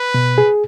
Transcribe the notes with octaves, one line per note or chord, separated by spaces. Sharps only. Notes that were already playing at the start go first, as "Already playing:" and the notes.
Already playing: B4
B2
G#4